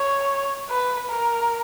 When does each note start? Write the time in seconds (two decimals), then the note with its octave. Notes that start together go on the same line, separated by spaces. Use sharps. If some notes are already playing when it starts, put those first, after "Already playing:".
Already playing: C#5
0.70 B4
1.09 A#4